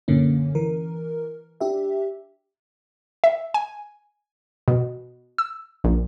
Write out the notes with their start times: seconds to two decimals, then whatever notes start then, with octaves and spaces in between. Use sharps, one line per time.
0.08 F#2 A#2 D3 A#3 C#4
0.55 E3 A#4
1.61 D4 G4 E5
3.24 E5
3.54 G#5
4.68 B2
5.38 E6
5.84 A#1